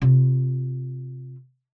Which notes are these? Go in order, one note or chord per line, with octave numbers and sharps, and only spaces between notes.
C3 F4